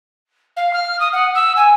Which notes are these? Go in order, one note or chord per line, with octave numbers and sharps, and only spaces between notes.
F5
F6
D#6
F#5
E6
G#5